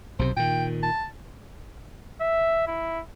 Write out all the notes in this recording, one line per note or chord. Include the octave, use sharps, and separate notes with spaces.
B1 C3 C5
A#2 D#3 G5
A5
E5
E4